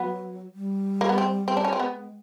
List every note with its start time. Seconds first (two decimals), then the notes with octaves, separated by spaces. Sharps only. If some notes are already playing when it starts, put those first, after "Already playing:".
Already playing: F#3 B3
0.55 G3
1.01 A#3
1.09 B3
1.18 C4
1.48 C4
1.57 D4
1.64 C#4
1.73 C4
1.80 G#3 B3